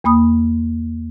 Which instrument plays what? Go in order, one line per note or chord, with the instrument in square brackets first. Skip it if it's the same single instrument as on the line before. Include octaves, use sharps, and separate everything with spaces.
[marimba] E2 A#3 B5 D#6